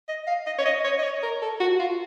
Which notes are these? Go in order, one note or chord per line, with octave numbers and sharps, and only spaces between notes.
D#5
F5
D#5
C#5
D#5
C#5
D#5
C#5
A#4
A4
F#4
F4